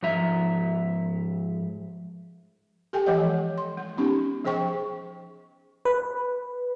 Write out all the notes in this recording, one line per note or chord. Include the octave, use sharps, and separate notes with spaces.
G#2 F3 E5 A#5
G4 A4 G5 G#5
E3 F3 G#3 G4 C#5 D#5
C6
G#3
B3 C#4 D#4 G4
F3 G#4 C5 G5 C#6
B4